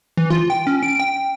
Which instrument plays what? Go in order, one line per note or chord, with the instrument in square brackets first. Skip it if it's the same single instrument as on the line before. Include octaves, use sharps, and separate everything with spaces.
[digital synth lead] E3
F4
G5
C#4
D7
G5